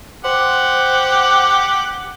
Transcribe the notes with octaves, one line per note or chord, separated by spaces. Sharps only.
G4 C5 F#5